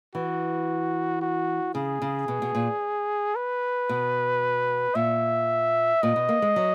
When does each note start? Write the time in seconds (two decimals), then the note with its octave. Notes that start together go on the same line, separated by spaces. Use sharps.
0.15 E3 F#4
1.22 F#4
1.75 C#3 G#4
2.02 C#3
2.28 B2
2.42 B2
2.55 A#2
3.36 B4
3.89 B2
4.95 A#2 E5
6.03 A#2 D#5
6.16 B2
6.29 A#3
6.42 G#3
6.56 F#3